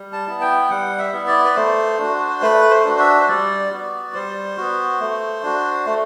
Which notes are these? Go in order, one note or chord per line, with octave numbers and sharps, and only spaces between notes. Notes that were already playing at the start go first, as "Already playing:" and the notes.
Already playing: G3
A5
B3 E4
G5
G3 F#5
E5
B3 E4
D5
B4
A3 C5
D4 F#4
A3 B4
C5
D4 F#4
E5
C5
G3 D5
B3 F#4
G3 C5
B3 F#4
A3
D4 F#4
A3